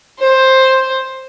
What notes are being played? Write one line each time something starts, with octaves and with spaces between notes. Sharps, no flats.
C5